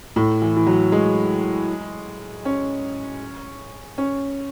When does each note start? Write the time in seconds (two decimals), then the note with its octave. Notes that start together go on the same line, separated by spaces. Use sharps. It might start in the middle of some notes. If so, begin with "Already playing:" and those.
0.16 A2
0.42 E3
0.56 E3
0.66 F#3
0.92 G#3
2.45 C#4
3.98 C#4